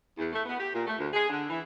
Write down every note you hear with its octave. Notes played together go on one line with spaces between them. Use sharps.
E2
A3
B3
G4
A#2
A3
D2
G#4
D3
E3